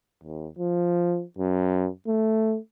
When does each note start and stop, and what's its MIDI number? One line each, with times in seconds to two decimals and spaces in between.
0.24 0.47 39
0.59 1.23 53
1.38 1.88 42
2.08 2.57 57